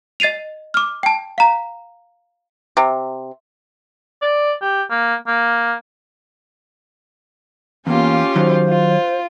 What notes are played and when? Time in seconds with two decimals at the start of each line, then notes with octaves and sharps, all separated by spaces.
0.20 D#5 A6 C7 D#7 F7
0.74 D6 F6
1.03 G5 A5
1.38 F5 A#5
2.77 C3
4.22 D5
4.61 G4
4.91 A#3
5.27 A#3
7.87 E2 A#3 C#4 F4 G4
8.36 D#3 F#3 C5
8.68 F4